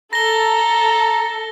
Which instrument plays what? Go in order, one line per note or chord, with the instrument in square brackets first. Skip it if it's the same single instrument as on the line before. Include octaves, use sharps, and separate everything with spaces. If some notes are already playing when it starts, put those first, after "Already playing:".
[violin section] A4 [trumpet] A#5 [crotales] A#6 G7